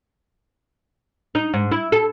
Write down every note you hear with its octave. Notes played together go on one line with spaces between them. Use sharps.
D#4
G#2
E4
A4